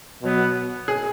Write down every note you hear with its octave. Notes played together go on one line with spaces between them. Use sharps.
B2 F#3 B3
G#4